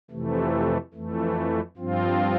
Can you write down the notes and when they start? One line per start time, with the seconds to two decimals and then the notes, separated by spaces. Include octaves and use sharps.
0.11 F2 C3 E3 A3
0.94 F2 E3 A3
1.77 G2 F3 C4 F4